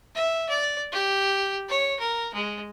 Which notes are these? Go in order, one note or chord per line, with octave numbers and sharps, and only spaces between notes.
E5
D5
G4
C#5
A#4
G#3